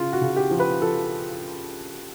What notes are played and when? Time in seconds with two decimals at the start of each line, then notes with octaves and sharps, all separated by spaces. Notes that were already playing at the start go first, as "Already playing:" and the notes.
Already playing: C#3 F4
0.13 F#4
0.21 C#3
0.36 G4
0.51 F3
0.59 B4
0.82 F3 A4